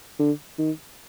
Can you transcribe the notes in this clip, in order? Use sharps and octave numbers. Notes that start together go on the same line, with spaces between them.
D3
D#3